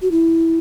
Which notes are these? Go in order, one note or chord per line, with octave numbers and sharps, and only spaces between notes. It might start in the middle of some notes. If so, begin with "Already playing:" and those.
F#4
E4